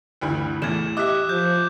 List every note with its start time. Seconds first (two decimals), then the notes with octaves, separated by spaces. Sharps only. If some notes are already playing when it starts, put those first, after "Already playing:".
0.21 D2 G2 E3
0.62 E2 A2 G#6 E7
0.97 G4 D#5 E5 D6 F#6
1.29 F3 G6